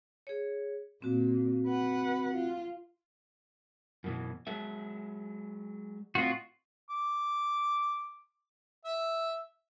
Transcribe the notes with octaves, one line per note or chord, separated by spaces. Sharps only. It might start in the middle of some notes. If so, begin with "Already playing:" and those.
G#4 C#5
A#2 A#3 C4 F#4
B4 F#5
F4
F#2 B2 E3
F#3 G#3 E5
A2 C4 F4 F#4 D#5
D6
E5